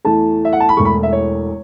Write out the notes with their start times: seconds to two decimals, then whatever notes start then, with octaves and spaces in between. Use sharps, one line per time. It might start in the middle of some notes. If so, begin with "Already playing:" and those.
0.05 E2 E3 A3 A5
0.45 E5
0.53 F#5
0.60 A5
0.69 B5
0.77 E1 E2 E3 A3 C#6
0.85 B5
1.03 E5
1.12 C#5